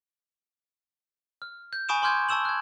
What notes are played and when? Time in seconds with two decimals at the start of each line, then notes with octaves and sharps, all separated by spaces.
1.42 F6
1.73 G6
1.89 G#5 B5 C#6 D#6 D7 E7
2.02 G#5 C6 D6 F6 G6 G#6
2.29 A5 C#6 E6 E7 F#7
2.45 F#6 G#6